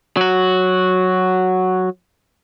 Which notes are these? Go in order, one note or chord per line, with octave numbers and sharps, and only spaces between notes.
F#3 F#4